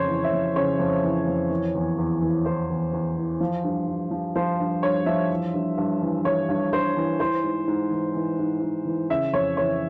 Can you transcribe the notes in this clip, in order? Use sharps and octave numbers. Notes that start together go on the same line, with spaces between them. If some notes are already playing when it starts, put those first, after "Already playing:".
Already playing: F2 C#3 C5 C#5
E3
E5
F2
C#3 C#5
F2
E3
F2
E3
E2
E2
E3
E3 C5
E2
E2
E3
F3
G2
G2
F3
F3 C5
G2
G2 C#5
F3 E5
E3
G2
G2
E3
E3 C#5
G2
G2 C5
E3
E3 C5
G#2
G#2
E3
E3
G#2
G#2
E3
C#3 E5
F2 C#5
E3 C#5